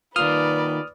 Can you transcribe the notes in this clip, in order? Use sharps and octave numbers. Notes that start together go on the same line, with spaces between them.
D#3 A#3 F4 B4 D5 D#6 F6